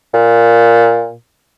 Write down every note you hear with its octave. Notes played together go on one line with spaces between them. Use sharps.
A#2